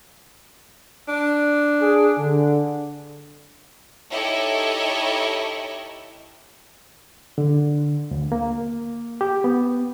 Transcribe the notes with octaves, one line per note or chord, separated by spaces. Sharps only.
D4
G#4
D3
D#4 E4 G4 A4 C#5 D#5
D3
D2
A#3
G4
B3